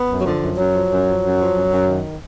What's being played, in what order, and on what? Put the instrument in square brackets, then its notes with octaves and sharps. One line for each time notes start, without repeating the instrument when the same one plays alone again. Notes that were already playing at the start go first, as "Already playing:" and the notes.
Already playing: [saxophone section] B3
F#2
F#3
D3 F3
F#2
F#2 F#3
F3
F#2
F3
F#2
F3
F#2
F#2
D#3